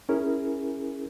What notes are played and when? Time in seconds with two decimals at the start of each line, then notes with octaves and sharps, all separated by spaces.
0.09 C#4 E4 G#4 A#4